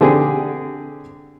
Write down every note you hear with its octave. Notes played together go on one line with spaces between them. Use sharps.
D3 C4 G4 G#4